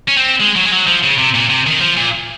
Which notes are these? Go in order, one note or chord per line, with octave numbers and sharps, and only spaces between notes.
C#4
C4
G#3
F#3
G#3
F#3
F3
C#3
C3
A#2
C3
D#3
F3
A#2